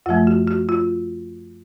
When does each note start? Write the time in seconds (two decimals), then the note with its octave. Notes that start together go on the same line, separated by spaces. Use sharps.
0.06 F#2 F3 A3 F4
0.27 F#4
0.48 F#4
0.69 F4